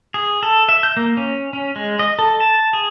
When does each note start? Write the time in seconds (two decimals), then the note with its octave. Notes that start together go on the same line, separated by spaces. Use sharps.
0.14 G#4
0.43 A4
0.69 E5
0.83 G6
0.97 A#3
1.17 C#4
1.53 C#4
1.76 G#3
1.99 D#5
2.19 A4
2.40 A5
2.73 G#4